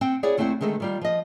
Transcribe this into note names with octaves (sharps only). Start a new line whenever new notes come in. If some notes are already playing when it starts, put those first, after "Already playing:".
C4 F#5 G5
E4 G#4 C#5 D5 F#5
D#2 A3 C4 E4 C5 F#5
D3 D#3 G#3 A3 A4
D#3 G3 F4
F3 D#5